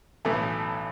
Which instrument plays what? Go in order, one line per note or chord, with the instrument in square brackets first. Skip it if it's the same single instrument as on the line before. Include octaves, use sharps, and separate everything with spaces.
[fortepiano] B1 A2 E3 A3